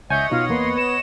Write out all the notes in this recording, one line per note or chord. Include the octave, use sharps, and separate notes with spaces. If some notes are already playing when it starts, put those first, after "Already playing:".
C#2 C#5 D#5 E5 F#5 G#5 G6
B2 D#4 F4 F5
E2 A#3 B3 C6
B4 E7